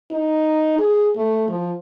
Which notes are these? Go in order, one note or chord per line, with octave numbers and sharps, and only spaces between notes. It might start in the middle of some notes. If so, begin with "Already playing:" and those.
D#4
G#4
A3
F3